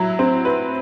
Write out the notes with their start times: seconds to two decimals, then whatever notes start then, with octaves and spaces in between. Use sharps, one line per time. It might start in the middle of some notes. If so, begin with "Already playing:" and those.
Already playing: F#3 E4
0.19 C4
0.45 B4